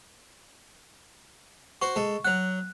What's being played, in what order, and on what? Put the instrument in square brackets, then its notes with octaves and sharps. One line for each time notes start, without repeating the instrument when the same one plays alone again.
[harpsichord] F#4 C5 [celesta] C#6
[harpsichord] G#3 A4
[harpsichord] F#3 F#5 [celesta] F#6